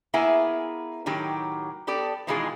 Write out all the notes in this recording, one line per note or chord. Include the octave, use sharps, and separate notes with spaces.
A#3 B3 E4 G#4 E5 G#5
A2 D#3 F#3 G4
B3 G4 A4 D5
B2 D#3 E3 G#3 F4 G#4